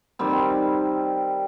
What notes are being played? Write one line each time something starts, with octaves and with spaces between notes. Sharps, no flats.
D#3 G3 C4